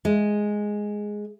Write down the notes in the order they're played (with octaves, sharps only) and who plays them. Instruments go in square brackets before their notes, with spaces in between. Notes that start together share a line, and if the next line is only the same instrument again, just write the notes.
[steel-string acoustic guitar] G#3